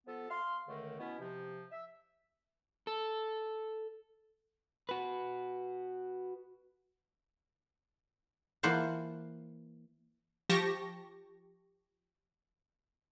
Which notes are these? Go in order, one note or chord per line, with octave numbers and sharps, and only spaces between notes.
F3 B3 A4
F5 C6
C#2 D3 D#3 A3
B2 B3 C#4 E4
C3 F3
E5
A4
F#4 B4
E3 A#3 F4 C5 F#5 A5
F3 G4 A5 C#6 A#6